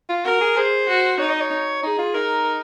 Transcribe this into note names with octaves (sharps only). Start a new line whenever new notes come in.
F4
F#4 A#4
G#4
G#4 C5
F#4
D#4 C#5
D#5
C#5
D#4 G#4
F4
D#4 A#4